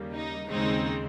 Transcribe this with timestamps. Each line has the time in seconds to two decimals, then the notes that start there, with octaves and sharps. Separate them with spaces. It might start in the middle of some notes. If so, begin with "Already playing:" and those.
Already playing: D#2 C#3 G3 A#3
0.14 D#4
0.49 D#2 C#3 G#3 C4 D#4